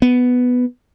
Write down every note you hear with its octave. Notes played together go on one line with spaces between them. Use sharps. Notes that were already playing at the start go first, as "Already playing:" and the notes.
B3